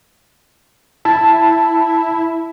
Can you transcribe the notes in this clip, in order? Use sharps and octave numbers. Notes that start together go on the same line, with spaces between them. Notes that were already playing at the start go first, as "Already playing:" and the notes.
E4 A5